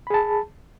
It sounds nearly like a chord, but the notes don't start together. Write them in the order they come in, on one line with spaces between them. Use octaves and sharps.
B5 G#4 A5